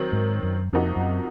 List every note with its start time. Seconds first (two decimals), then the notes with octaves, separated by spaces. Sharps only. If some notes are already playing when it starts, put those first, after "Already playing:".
Already playing: D#3 F#3 C4
0.12 G#2
0.43 F#2
0.73 F2 C3 F3 A#3 D#4 F#4
0.96 F#2